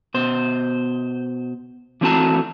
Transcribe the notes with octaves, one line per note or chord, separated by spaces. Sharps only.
B2 C5
E3 A3 C4 F#4 A5 A#5